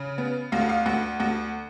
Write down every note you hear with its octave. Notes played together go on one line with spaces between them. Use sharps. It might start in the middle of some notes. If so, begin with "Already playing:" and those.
Already playing: C#3
B3
D2 F5
F#5
F5
D2 F#5
D2 F#5